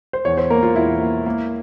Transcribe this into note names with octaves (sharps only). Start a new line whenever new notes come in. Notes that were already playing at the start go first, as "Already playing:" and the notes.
C5
E2 C#5
C5
A#3 A#4
F4
E2 E4
A#3
A#3